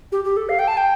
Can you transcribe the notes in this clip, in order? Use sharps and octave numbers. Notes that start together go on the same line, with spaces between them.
G4
G4
A4
F5
G5
A5
G5